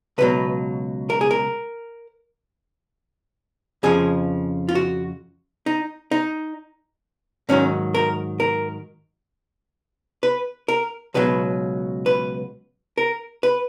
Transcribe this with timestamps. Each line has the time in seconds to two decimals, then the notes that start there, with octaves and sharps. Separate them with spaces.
0.18 C#2 B2 F#3 B4
1.10 A#4
1.21 G#4
1.31 A#4
3.83 F2 C#3 F3 G#4
4.69 F4
4.75 F#4
5.66 D#4
6.11 D#4
7.49 G#2 D#3 F#3 C#4
7.94 A#4
8.40 A#4
10.23 B4
10.68 A#4
11.14 C#2 B2 F#3 B4
12.06 B4
12.98 A#4
13.43 B4